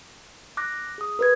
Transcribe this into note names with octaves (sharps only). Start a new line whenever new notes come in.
D6 F#6 A#6
G#4 D#6
A#4 B4 G#6